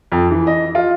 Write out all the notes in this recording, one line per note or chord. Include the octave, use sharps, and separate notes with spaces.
F2
E3
D#5
F4